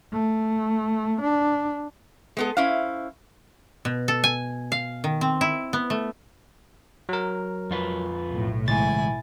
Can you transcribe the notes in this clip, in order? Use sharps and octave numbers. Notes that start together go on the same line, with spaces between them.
A3
D4
G#3 B3 A4
C#4 E4 C5 F5
B2
A4
G#5
F5
D#3
C4
E4
B3
A3
F#3 A#4
F2 F4 B4
B1 A2
C#3 E3 G#3 E4 G#5 A6